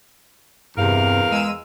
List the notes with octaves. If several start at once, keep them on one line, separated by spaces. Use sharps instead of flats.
E2 G2 C3 A#4 F5
G#3 E6 D#7